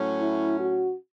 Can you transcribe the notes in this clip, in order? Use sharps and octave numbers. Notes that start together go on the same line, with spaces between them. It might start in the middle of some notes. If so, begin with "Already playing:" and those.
Already playing: A2 F#3 C#4
E4
F#4